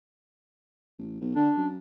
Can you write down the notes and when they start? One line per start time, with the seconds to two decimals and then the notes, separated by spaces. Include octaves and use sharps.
0.98 A1
1.21 B1
1.36 D3 D4
1.56 F#2